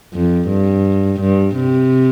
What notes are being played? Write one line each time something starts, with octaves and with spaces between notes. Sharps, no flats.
F2
G2
G2
C3